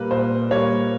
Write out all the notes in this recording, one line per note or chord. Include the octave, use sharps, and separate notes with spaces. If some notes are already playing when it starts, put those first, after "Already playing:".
Already playing: A#2 G3 A#3 B4
A#2 C5
G3 A#3 C#5